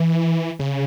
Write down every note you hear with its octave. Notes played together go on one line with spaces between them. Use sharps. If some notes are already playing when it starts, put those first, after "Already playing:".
Already playing: E3
C#3